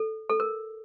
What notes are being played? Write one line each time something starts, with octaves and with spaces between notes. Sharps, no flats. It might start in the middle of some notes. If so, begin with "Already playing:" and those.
Already playing: A4
A4
A#4